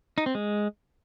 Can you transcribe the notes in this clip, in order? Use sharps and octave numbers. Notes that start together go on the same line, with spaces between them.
D#4
C4
G#3